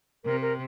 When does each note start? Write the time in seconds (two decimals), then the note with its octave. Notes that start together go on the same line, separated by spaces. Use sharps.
0.25 C3 A#4
0.41 A#4